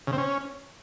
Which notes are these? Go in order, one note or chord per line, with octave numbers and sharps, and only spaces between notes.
C#3
C4
C#4